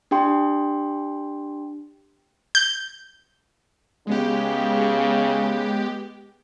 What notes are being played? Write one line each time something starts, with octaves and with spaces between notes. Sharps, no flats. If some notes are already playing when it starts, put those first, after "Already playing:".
D4 G4 G5 C6
G6
C#3 G#3 B3 G4